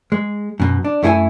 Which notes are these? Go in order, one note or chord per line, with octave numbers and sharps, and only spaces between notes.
G#3
F#2 B2
D4
F#2 A3 E4 G#4 A4 G#5